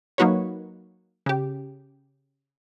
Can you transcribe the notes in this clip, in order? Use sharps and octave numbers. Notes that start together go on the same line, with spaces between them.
F#3 A#3 D#4 F#4 B4 C#5
C#3 G4